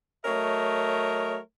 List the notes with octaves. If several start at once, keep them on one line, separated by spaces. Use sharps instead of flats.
F#3 A3 A#4 C#5 D#5